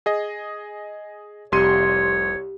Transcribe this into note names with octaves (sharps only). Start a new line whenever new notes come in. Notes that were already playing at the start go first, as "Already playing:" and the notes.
G#4 D#5
F1 C2 G4 C#5 C6 D#7